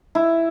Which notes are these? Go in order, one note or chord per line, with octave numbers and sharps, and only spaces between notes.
E4